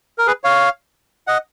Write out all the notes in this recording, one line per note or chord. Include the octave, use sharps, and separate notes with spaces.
A#4
G#4 B4
C#5 F5
D#5 F#5